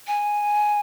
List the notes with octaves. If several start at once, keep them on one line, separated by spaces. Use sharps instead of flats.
G#5